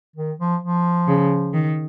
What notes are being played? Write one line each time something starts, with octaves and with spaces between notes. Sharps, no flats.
D#3
F3
F3
C#3
D#3